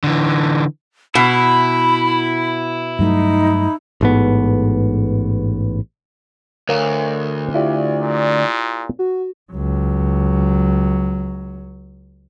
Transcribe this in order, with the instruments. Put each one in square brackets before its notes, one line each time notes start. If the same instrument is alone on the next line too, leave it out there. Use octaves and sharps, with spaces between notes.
[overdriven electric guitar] D3 E3
[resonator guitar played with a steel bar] B2 [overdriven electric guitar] E4 [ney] B5
[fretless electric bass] G2 F#3 A3 [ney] D#4
[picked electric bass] A1 G#2 B3
[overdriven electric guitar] D2 [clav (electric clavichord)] A#4 C#5 F5
[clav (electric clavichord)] E4 F4 G4 [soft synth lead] D5
[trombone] A#2
[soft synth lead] F#4
[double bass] C#2 F#3